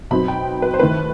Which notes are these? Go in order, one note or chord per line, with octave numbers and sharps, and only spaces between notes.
B2 F#3 C4 D#4 B5
G5
B4
C5
D#3 A3 E4 B4